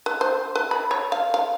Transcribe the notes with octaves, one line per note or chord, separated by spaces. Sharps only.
B4
C5
B4
B5
C#5
F5
F5